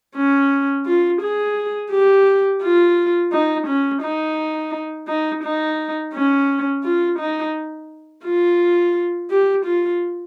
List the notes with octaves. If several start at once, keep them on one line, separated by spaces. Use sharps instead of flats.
C#4
F4
G#4
G4
F4
D#4
C#4
D#4
D#4
D#4
C#4
F4
D#4
F4
G4
F4